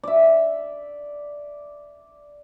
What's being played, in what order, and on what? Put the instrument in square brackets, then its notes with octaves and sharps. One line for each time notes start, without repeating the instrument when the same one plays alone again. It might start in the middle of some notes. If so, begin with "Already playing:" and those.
[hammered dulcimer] D5 E5